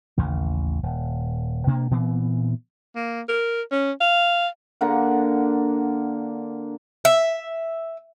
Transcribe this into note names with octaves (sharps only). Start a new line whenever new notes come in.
A1 D#2 C#3
D#1
B2 A#3 D4
A#2 E3 B3 C4
A#3
A#4
C#4
F5
D3 A#3 D4 F#5
E5